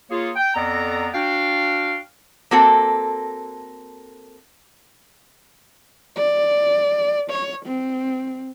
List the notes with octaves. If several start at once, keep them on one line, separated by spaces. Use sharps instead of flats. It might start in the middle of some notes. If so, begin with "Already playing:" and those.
A#3 F4 G#4 C#5
G5
F2 B3 A4 D5 A#5
D4 F#4 F5 G5
A#3 C4 F#4 A4
D5
C#5
C4